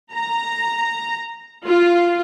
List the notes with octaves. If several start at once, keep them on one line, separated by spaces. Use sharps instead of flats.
A#5
F4